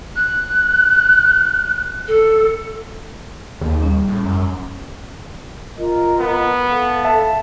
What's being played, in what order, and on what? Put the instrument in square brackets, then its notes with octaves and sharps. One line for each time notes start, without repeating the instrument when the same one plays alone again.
[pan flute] F#6
A4
[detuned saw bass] D#2 [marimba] G#4
[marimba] G3 C#4
[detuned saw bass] A2
F#2
[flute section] F4 A#4 D#5
[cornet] B3
[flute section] A4 F5
[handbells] E5 A5